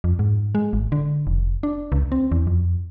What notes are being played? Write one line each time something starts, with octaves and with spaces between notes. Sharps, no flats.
F2
G#2
G#3
G#1
D3
F1
D4
C#2
C4
E2
F2